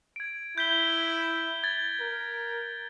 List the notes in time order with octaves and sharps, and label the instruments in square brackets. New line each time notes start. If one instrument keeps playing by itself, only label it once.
[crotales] G#6 D7
[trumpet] E4 [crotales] G6 B6 G7
[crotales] G#6 A6
[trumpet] A#4